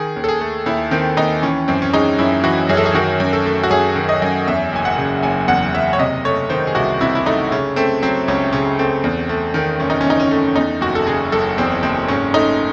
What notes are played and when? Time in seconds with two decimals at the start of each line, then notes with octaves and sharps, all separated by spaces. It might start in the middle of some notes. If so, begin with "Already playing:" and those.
Already playing: D#3 G#4
0.16 D#2
0.24 A4
0.28 G#4
0.41 A3
0.66 D#2 E4
0.91 D#3 C4
1.17 D#2 D#4
1.42 E3 C#4
1.68 F#2 C4
1.82 C#4
1.94 G#3 D#4
2.19 F#2 E4
2.43 E3 F#4
2.69 F#2 G#4
2.77 A4
2.86 G#4
2.94 D#3 F#4
3.20 F#2
3.33 A4
3.46 A3
3.63 F#4
3.71 F#2 G#4
3.96 D#3
4.09 D#5
4.22 F#2
4.47 E2 E5
4.73 F#1 G#5
4.85 F#5
4.97 C#3
5.23 F#1 G#5
5.48 E2 F#5
5.73 F#1 E5
5.93 C#5
5.99 C3 D#5
6.25 A3 C#5
6.49 D#3 C5
6.67 G#4
6.75 C2 F#4
7.01 C3 E4
7.15 E4
7.26 A3 D#4
7.51 C#3 C#4
7.76 A3 C4
8.02 F#3 C4
8.28 C#2 C#4
8.53 C#3 C#4
8.79 A3 C4
9.04 E2
9.29 A3
9.54 D#3
9.80 F#1 C#4
9.90 D#4
10.01 C#4
10.06 E2 D#4
10.20 C#4
10.31 A3
10.56 E2 D#4
10.81 F#1 F#4
10.95 A4
11.07 C#3 G#4
11.32 F#1 A4
11.58 E2 C4
11.83 F#1 C4
12.08 G#2 C#4
12.34 A3 D#4